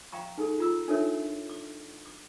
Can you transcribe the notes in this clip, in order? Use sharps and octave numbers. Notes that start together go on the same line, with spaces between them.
F5 G5 A#5 C#6
D#4 G#4 A4
F4 A#5 E6
D4 D#4 A4 A#4 C#5 E5
D6
D6